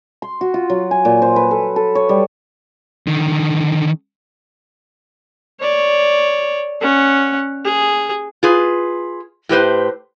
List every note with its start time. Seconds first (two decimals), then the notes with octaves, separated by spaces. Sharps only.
0.22 C6
0.41 F#4
0.54 F4
0.70 F#3
0.91 G#5
1.05 A#2
1.22 C5
1.36 B4
1.51 A4
1.76 A4
1.95 C#5
2.09 G3
3.07 D3 D#3
5.60 C#5 D5
6.81 C#4 F#5
7.65 G#4
8.43 F4 G#4 B4
9.49 A2 G4 B4 C5